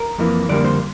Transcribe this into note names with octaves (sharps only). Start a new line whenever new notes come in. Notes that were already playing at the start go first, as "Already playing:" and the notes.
Already playing: A#4
F2 E3 A#3
F2 D3 G3 A#3 D5
C5